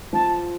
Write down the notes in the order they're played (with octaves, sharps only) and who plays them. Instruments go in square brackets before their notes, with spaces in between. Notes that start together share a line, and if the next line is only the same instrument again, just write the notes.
[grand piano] F3 [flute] A5